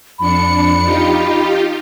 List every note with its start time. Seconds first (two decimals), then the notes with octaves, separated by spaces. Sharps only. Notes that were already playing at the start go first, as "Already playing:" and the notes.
0.19 F2 D4 B5 C#7
0.85 D#4 F4 G4